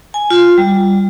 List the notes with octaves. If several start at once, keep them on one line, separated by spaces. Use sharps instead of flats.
G#5
F4
G3